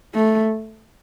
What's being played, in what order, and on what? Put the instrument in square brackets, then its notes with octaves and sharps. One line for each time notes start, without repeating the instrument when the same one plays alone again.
[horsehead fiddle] A3